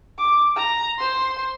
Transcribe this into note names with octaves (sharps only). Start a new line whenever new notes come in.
D6
A#5
C5 C6